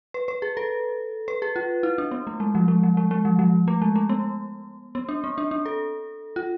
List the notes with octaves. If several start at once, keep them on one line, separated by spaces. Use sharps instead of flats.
B4
B4
G#4
A4
B4
G#4
F4
E4
D4
B3
A3
G#3
F3
G#3
F3
G#3
G#3
F3
F3
A3
G#3
A3
B3
B3
D4
C4
D4
D4
A4
F4